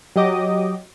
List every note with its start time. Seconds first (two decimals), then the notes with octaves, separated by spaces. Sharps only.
0.16 F#3 G4 D#5 D6 D#6